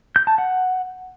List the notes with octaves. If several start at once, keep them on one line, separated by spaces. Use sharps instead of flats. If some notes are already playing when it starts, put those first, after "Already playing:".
G6
A5
F#5